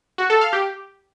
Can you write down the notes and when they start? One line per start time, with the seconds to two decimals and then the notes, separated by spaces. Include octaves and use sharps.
0.18 F#4
0.30 A4
0.41 F5
0.53 G4